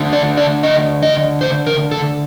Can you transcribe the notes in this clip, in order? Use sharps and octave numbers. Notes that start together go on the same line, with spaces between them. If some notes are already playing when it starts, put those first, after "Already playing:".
Already playing: D3 A3 D4
D5
D5
D#5
D#5
C5
A#4
A4